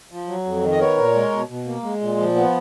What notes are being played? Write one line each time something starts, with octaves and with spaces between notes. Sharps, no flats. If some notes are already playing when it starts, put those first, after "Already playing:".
F3
F#3
F2
D#3
D#5
B3 A#4 C#5
A#2
G#3
B2
B2
A#3
G#3
A#2
F3
B3